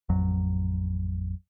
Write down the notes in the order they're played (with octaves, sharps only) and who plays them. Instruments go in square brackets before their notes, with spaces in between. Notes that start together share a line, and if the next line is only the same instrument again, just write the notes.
[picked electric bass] A1 F2 F#3